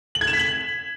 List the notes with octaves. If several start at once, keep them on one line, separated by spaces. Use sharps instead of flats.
F#7
G#6
E7
B6
F#7